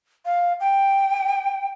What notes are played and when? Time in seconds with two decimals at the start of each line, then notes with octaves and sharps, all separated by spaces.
0.25 F5
0.60 G5